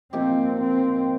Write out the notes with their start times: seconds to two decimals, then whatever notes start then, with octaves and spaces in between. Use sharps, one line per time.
0.13 F3 A#3 C4 D#4 G4
0.61 C4